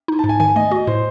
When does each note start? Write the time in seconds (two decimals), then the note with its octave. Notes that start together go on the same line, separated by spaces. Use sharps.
0.08 D#4
0.19 A5
0.24 G#2
0.29 G#5
0.40 D#3 G#5
0.56 A3 D#5
0.71 F#4 D#5
0.87 A2 C5